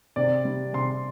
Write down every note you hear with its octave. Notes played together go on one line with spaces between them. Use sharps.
C3 D5
G3
C3 C6